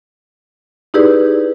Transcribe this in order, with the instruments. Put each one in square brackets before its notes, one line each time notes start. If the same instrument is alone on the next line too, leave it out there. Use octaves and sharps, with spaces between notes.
[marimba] D#4 E4 G4 G#4 B4 D5